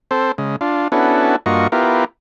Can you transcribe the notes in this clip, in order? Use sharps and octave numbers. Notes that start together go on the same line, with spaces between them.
C4 A4 C5
C#3 G#3
D4 F4
B3 C#4 D4 E4 F#4 A4
G2 A#3 F4 F#4 D#5 C#6
B3 E4 F4 G4 A#4